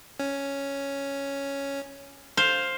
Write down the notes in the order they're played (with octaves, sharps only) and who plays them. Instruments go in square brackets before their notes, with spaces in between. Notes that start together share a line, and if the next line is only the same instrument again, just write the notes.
[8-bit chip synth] C#4
[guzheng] C5 F5